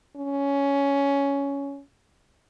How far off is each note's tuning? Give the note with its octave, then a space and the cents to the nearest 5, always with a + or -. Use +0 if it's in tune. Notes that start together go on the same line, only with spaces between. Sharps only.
C#4 +10